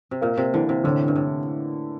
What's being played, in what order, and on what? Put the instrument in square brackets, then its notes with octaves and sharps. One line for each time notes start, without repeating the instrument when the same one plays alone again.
[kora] C3
[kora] A#2 [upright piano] A#3
[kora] C3
[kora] D3 [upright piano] E3
[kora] C3
[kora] A2 [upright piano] D3
[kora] G2
A2